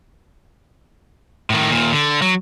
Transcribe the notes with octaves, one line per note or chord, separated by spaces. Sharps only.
A2 D#3
D#2 A#2
D3
F#3